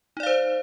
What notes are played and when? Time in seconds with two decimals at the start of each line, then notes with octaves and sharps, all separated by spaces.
0.17 D#4
0.20 D5
0.23 F5
0.27 C5